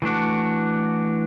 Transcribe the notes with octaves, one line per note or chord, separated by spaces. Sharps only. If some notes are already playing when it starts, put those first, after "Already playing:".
E3 A3 D4 F#4